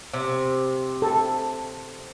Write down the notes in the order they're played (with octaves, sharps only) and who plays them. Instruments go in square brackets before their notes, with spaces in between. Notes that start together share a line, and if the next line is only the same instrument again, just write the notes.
[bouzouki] C3
[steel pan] A4